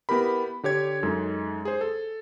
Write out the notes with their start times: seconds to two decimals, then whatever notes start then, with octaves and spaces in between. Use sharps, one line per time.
0.09 B3 E4 G4 A#4 B5
0.63 D3 G4 C#5 G#6
1.03 F#2 G#3 D#4 A4
1.65 G#4 C5
1.81 A4